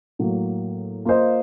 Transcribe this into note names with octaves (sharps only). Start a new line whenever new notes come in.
A2 F#3 A#3
A#3 F4 C5 D#5